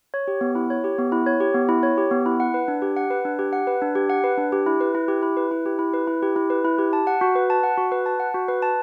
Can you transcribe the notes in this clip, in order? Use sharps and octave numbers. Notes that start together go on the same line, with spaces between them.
C#5
G4
B3
E4
C#5
G4
B3
E4
C#5
G4
B3
E4
C#5
G4
B3
E4
F#5
B4
D4
G4
F#5
B4
D4
G4
F#5
B4
D4
G4
F#5
B4
D4
G4
E4
B4
E4
G4
E4
B4
E4
G4
E4
B4
E4
G4
E4
B4
E4
G4
A5
F#5
F#4
B4
A5
F#5
F#4
B4
A5
F#5
F#4
B4
A5